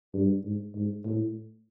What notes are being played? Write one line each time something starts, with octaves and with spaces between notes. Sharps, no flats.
G2
G#2
G#2
A2